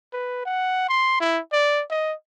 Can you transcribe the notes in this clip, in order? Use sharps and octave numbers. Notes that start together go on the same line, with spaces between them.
B4
F#5
C6
E4
D5
D#5